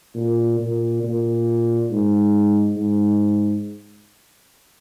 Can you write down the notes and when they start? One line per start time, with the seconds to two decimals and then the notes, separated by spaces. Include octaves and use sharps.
0.16 A#2
0.60 A#2
1.03 A#2
1.90 G#2
2.77 G#2